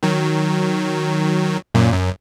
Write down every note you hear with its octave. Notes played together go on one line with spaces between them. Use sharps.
D#3 F#3
F#2 A#2
F#2